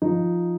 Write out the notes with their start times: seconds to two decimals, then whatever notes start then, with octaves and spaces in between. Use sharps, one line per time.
0.02 F3 D#4